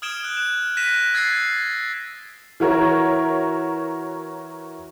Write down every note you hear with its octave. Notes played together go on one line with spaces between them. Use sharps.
D#6 F6 G#6 D7 E7 G7
F#6
E7
F#6 A#6 B6 D#7 E7
E6 G#6 A6 B6 C7
E3 F#4 A#4 C#5